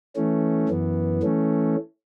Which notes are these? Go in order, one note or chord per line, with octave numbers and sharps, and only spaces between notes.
E3 A3 C#4
F#2 E3 B3
E3 A3 C#4